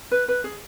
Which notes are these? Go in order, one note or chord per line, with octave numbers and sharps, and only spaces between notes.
B4
B4
G#4